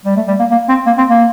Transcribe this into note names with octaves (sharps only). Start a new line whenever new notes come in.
G3
A3
G3
A#3
A#3
C4
A#3
C4
A#3